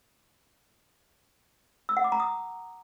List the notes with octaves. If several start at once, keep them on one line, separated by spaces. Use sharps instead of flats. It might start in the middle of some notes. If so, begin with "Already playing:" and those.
E6
F#5
D6
A#5
D#6